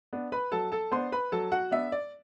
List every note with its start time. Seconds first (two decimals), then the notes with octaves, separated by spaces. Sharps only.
0.13 B3 D4
0.32 B4 B5
0.52 F#3 A4 A5
0.72 A4 A5
0.92 B3 D4 C5 C6
1.12 B4 B5
1.32 F#3 A4 A5
1.52 F#4 F#5
1.71 B3 D4 E5
1.92 D5